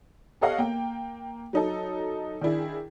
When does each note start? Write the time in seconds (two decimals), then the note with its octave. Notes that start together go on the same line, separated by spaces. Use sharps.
0.41 G4 A4 C#5 D#5 F5 F#5
0.58 A#3 G5
1.53 F#3 D#4 A4
2.41 D#3 D4 E4 G#4